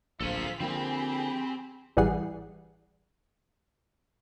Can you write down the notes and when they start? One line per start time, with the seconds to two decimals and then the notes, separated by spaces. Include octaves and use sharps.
0.20 D1 A#1 F4 A4 C5 G#5 B6
0.60 D3 F3 A#3 C4 G4 G#4 B5
1.97 A1 E3 G3 G#4 F#5 C7